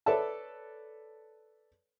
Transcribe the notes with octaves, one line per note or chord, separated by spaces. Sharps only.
A4 B4 C#5 D5 E5 A5